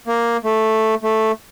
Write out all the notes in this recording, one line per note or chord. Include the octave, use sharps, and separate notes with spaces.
A#3
A3
A3